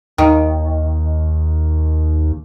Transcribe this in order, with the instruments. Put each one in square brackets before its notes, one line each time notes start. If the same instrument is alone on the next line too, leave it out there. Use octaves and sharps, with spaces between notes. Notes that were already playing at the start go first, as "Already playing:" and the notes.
[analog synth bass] D#2 [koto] D#3